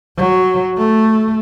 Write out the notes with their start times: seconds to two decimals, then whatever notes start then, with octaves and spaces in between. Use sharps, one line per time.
0.17 F#3
0.78 A3